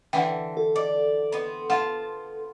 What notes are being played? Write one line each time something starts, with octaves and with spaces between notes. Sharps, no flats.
D3 E3 F#5 G5
A4
D5
B3 C4
F4 F#5 A5